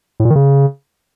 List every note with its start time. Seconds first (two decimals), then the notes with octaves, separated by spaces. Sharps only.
0.20 A2
0.25 A#2
0.30 D#3
0.36 C#3